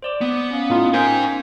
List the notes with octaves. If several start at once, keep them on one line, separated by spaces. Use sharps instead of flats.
C5 D5 D6
B3
C#4 F5
A2 D#4 F4
D#4 A#4 C5 G5 G#5